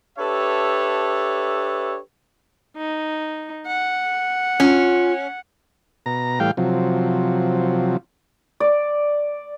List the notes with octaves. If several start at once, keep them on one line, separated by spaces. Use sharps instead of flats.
D4 G4 A4 B4 C#5 E5
D#4
F#5
C#4 F4
B2 A#5
A2 E3 G3 F5 G5
C3 F3 F#3
D5